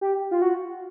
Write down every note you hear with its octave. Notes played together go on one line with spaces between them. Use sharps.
G4
F4
F#4